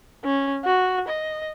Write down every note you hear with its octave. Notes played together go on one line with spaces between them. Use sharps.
C#4
F#4
D#5